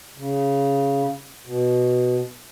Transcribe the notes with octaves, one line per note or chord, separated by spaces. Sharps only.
C#3
B2